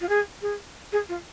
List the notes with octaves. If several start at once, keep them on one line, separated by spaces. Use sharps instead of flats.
F4
G#4
G#4
G#4
F4